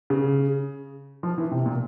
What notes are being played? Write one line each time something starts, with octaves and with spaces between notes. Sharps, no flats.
C#3
F3
E3
C3
A#2